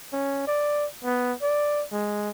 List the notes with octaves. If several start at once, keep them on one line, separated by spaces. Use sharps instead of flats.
C#4
D5
B3
D5
G#3